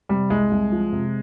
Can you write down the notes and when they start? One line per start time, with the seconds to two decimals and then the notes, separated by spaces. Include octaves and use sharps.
0.09 C3 G3
0.30 C2 G#3
0.51 C2
0.72 F3
0.93 C3